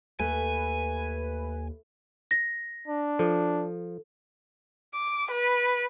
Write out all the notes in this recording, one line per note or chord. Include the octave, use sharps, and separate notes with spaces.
D#2 A3 B4 G#5
A#6
D4
F3 A4
D6
B4